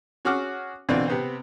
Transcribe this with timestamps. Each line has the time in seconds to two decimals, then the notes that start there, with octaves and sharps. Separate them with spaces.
0.25 C#4 F#4 G#4 F#5 D6 F6
0.89 B2 D3 E3 C4 D4 F4
1.08 C3 B3 C4